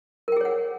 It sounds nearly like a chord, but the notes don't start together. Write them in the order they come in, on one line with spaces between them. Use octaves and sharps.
A#4 G5 G#4 C#5 F#5